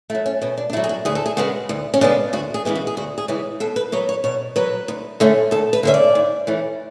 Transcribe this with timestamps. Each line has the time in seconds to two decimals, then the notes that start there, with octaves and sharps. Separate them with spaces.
0.10 A3 E4
0.15 F#3
0.26 C#4
0.42 B2 C#4
0.58 D4
0.70 D4
0.73 A3 E4
0.77 F#3
0.84 G#4
0.89 F#4
1.05 D2 G#4
1.15 A4
1.26 G#4
1.37 C#3 G#3 B3 F#4
1.69 D2
1.94 C#4
2.01 C#3 G#3 B3 D4
2.33 D2 F#4
2.54 G#4
2.65 C#3 E3 G#3 B3
2.75 F#4
2.87 G#4
2.97 D2 F#4
3.18 G#4
3.28 C#3 E3 G#3 B3
3.60 B2 A4
3.76 B4
3.92 F#3 B3 C#5
4.09 C#5
4.24 B2 C#5
4.56 F#3 B3 B4
4.88 D2
5.20 D3 A3 C#4
5.51 D2 A4
5.73 B4
5.83 D3 A3 C#4 E5
5.94 D5
6.15 G#2
6.47 E3 A3 C#4